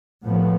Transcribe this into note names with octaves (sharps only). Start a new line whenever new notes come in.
A2 F3 B3